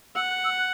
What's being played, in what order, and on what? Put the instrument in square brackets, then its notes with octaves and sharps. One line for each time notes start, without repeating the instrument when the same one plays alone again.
[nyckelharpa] F#5 [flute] E6
[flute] F#6
E6
F#6